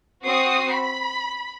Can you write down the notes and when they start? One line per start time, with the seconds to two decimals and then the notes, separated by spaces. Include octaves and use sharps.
0.25 C4 F#4 D#6 C7
0.73 B5